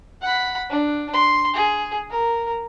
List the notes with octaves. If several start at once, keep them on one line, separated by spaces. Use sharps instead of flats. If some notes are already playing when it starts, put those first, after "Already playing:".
F#5 B5
D4
C6
G#4
A#4